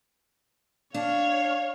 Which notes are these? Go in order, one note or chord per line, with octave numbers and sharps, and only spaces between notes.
D4 C#5 F5